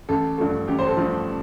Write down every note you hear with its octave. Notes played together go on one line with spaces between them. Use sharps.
A1 A4
G2 F3 A3 A4
A1 G4
C5
A4
G2 F3 A3